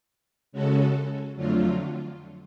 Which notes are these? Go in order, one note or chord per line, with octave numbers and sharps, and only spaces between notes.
C#3 G#3 C#4 F#4 A4
F2 D3 F#3 A3 F4